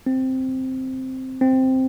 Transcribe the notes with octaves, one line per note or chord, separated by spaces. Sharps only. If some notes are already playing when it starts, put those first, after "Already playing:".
C4
C4